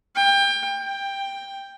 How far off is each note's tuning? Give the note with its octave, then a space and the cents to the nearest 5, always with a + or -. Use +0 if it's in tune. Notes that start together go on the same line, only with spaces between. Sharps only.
G5 +25
G5 +10